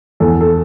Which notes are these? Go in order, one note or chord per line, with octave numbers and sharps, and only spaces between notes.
E2 A4
A4